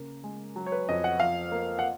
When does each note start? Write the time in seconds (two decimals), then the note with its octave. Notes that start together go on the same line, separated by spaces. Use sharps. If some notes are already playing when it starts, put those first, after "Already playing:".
Already playing: C#3 A#3
0.24 G#3
0.56 F#3
0.66 C#5
0.72 B4
0.89 F2 D#5
1.04 F#5
1.20 F3 F5
1.52 A#3
1.79 F#5